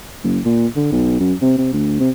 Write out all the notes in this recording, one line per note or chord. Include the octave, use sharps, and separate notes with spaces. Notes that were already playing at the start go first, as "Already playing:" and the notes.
F#1
A#2
D3
B1
F#2
C3
C3
D2
C3